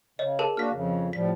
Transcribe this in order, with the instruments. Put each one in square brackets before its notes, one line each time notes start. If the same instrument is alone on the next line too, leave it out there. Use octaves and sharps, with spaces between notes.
[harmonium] C#3 [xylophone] C#5 D#5
[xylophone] G#4 A#4 A5
[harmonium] A#3 D4 F#4 [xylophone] F6 B6
[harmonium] F2 C#3
[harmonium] A2 F3 G3 [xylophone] B6